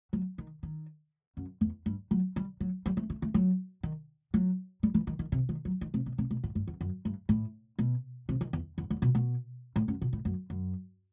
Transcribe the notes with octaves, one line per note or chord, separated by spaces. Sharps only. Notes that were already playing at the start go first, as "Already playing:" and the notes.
F#3
D#3
D#3
F#2
E2
G2
F#3
G3
F#3
G3
A3
A3
A3
F#3
D#3
F#3
G3
E3
D#3
D#3
C3
D#3
F#3
D#3
C3
B2
C3
B2
A2
G2
E2
F#2
G2
A2
B2
C3
D#3
E2
E2
E2
B2
B2
A2
F#2
B2
A2
F#2
F#2